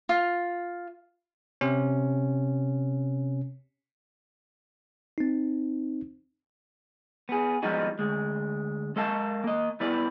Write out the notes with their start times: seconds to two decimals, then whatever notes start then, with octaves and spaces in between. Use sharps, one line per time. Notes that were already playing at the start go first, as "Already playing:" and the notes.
0.09 F4
1.61 C3 C#4
5.18 C4 D#4
7.29 B3 G#4
7.63 F3 G3 G#3 B3 D#4 F#4
7.99 D2 G#3
8.96 G#3 A4 A#4 F5 A5
9.44 A#3 D#5
9.80 G3 B3 E4 B4 D5